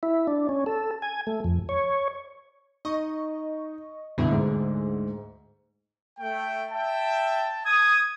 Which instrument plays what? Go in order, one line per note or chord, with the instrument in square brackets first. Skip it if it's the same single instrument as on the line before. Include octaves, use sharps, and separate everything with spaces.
[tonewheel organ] E4
D4
C#4
A4
G#5
A3
F2
C#5
[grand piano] D#4 [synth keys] D#5 C#6
[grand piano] C2 G2 B2 [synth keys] D3 G#4
[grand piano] D2 G#2
[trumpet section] A3 G5
[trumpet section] E5 G5 [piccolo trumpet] A5
[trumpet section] D#6 [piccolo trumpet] G#6